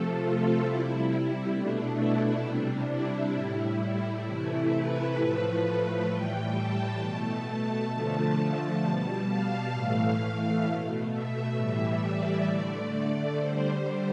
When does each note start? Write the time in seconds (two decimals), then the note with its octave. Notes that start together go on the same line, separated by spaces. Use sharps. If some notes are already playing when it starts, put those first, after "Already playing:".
Already playing: C3 F3 A3 A4
0.14 F4
0.61 C3 G3 E4
1.52 B2 A3 D4
1.97 E4
2.42 C3 G3 D4
2.88 E4
3.34 A2 G3
3.80 E4
4.25 C3 E3 A3
4.71 B4
5.17 A2 F3 A3
6.08 A2 E3 G3 G5
6.53 A5
7.00 B2 A3
7.45 A5
7.91 D3 F3 A3 A5
8.81 B2 G3 A5
9.27 F5
9.72 A2 E3 A3
10.65 B2 A3
11.10 E5
11.55 A2 E3 G3
12.02 D5
12.47 D3 A3
12.92 D5
13.38 D3 G3 C5